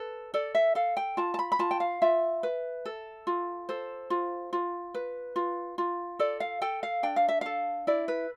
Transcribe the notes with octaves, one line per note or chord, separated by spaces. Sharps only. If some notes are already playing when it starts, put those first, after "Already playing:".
Already playing: A4 B4
A4 D5
E5
A4 F5
G5
F4 A5
A5
B5
B5
F4 A5
G5
F5
F4 E5
B4
A4
F4
A4 C5
F4
F4
B4
F4
F4
A4 D5
F5
A4 G5
F5
D4 G5
F5
E5
A4 F5
E4 D5
B4